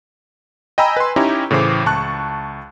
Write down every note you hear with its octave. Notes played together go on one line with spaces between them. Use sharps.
D#5 G5 G#5 A#5 B5 E6
B4 G#5 C6
C#4 D#4 E4 G4 C#5 A#5
A2 C#3 E3 C5 D6
C#2 A5 C#6 F#6